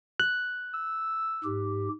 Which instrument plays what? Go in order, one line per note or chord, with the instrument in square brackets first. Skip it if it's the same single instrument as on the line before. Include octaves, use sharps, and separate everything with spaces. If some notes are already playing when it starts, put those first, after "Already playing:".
[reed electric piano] F#6
[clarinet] E6
[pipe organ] G#2 G4